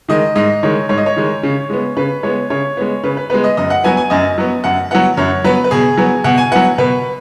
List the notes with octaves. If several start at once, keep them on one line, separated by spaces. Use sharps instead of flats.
D#3 G#3 D#5
G#2 D#5
D#3 G#3 C#5
G#2 C#5
D#5
C#5
D#3 G#3
C#3
G#3 B3
C#3 B4
G#3 B3 C#5
C#3 C#5
G#3 B3
C#3 B4
B4
G#3 B3 B4
D#5
F#2 D#5
F#5
F#3 B3 G#5
G#5
F#2 D#5
F#3 B3
F#2 F#5
F#3 B3 F#5
F#2 C#5
F#3 B3 B4
B4
B2 G#4
F#3 B3
B2 F#5
G#5
F#3 B3 F#5
B2 B4